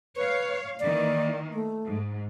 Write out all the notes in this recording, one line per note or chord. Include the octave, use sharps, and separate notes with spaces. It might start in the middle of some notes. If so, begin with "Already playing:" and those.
B4 C#5 F5
D#3 E3 A#3 D5
A3
G#2